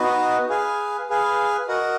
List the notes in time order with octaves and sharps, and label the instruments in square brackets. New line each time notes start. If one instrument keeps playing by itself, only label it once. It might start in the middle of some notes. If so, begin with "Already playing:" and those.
Already playing: [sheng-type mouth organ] B3 D#4 F#4 B4 D#5
G#4 B4 F5 G#5
G#4 B4 F5 G#5
F#4 A#4 D#5 F#5